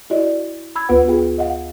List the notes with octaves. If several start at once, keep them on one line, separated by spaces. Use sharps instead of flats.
E4 F#4 D5 D#5
B5 E6 G#6
D2 B3 F4 B4 F#5
F4 G#4 G5
D#5 F5 F#5